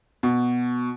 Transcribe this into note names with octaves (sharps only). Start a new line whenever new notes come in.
B2